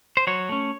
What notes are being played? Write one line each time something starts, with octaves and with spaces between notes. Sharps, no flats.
C5
F#3 C#5
A3 C#4